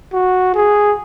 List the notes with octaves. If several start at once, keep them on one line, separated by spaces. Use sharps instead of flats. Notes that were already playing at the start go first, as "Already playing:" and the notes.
F#4
G#4